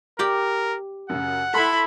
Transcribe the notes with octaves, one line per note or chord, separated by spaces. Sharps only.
G4 A#4 D5 G5
F#2 C#3 F#5
E4 A4 B5 C6